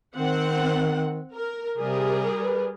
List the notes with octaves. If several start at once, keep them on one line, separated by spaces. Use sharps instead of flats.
D#3 C4 F#5
A#4
C3 G3 G#4 A#4
B4